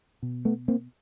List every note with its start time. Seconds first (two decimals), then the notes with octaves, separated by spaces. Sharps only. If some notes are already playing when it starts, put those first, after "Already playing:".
0.23 B2
0.45 A3 B3
0.68 A#3 C4